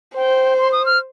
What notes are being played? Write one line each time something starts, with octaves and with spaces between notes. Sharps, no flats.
C5 G5
C6
D#6
F6